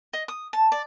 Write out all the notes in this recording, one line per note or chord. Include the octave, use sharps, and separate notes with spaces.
D#5
D#6
A5
D5